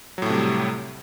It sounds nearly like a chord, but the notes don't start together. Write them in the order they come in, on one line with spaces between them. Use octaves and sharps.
F#3 A2 A3 C3 G3